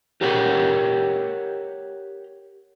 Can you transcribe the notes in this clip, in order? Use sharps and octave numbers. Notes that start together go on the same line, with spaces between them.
G4 A#4 C#5 F#5 G5